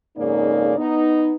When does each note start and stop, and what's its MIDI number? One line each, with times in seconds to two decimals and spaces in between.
0.17 0.74 41
0.17 0.74 44
0.17 0.74 49
0.17 0.74 58
0.17 0.74 63
0.17 0.74 74
0.77 1.35 59
0.77 1.35 63